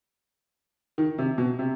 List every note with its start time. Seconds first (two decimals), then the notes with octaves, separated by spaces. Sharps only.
0.98 D#3
1.18 C3
1.38 B2
1.59 C3